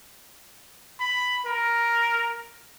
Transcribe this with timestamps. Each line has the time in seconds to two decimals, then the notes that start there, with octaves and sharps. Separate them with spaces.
1.00 B5
1.46 A#4